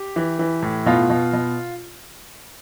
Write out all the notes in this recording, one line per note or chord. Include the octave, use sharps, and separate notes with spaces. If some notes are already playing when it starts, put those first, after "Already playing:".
Already playing: G4
E3
E3
A2
B2 F4
B2
B2